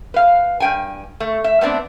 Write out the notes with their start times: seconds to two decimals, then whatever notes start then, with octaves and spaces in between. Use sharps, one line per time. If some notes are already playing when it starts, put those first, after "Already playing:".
0.14 B4 F5
0.60 G2 G5 G#5
1.20 A3
1.44 E5
1.61 A3 B3 C4 D4